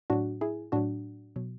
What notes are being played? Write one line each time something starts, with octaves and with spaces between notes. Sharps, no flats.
A2 F#3 D4 F#4
E4 G#4
A2 F#3 D4 F#4
B2 F#3